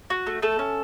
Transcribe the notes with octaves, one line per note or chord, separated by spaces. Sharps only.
F#4
A3
A3 A4
C#4